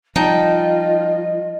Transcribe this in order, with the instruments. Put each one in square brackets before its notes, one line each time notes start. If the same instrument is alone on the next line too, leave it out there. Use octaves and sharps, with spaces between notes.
[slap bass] F3 G3 [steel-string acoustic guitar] D#4 G5 A5 [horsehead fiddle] F4 [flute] D#5